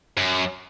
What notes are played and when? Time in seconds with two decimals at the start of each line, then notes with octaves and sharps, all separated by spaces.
0.17 F#2